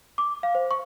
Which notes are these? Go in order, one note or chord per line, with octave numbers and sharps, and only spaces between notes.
D6
F5
C5
C#6